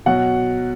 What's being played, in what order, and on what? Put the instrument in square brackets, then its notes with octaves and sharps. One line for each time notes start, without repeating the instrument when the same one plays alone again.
[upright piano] B2 F#3 F#5